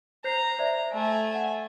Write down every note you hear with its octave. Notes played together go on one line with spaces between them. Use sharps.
C5 A#5 G6 C7
C5 D5 E5
A3 G#5
F#5